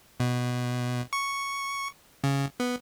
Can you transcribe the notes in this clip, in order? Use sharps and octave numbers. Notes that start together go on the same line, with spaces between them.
B2
C#6
C#3
B3